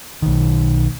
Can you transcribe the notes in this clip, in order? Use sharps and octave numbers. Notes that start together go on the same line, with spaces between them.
B1 D#3